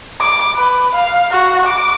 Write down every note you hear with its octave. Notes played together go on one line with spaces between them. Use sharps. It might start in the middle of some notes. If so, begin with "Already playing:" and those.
D6
B4
F5
F#4
D6